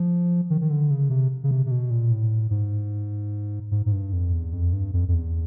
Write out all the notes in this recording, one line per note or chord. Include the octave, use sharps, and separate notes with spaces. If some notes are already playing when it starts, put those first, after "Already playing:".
Already playing: F3
D#3
D#3
D3
C#3
C3
C#3
C3
C3
B2
A#2
A2
G#2
G#2
G#2
G2
F2
E2
F2
G2
F2
F2
E2